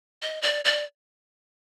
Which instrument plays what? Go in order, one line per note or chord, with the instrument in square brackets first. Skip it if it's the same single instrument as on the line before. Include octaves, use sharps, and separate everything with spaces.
[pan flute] D#5
D5
D5